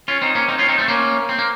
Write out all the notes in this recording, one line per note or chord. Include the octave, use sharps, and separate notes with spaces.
C#4 F4
C4 D#4
A#3 C#4
C4 D#4
C#4 F4
C4 D#4
A3 C4
A#3 C#4
C4
A#3